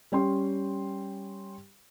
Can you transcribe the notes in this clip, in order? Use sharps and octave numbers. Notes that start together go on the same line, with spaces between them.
G3 C#4 G5 C6